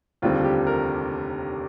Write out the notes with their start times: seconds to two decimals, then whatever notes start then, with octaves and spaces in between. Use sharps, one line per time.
0.22 F1 D#2 D3 G3 C4 F4
0.44 G4
0.67 A#4